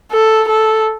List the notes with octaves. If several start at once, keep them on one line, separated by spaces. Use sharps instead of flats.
A4
A4